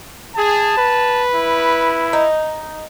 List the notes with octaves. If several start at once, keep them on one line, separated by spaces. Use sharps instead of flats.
G#4 A5
B4
E4
D#4